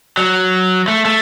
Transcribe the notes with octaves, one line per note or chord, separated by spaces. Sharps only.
F#3
A3
A3